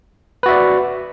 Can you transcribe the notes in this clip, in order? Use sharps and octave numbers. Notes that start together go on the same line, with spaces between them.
F#4 B4 D5 E5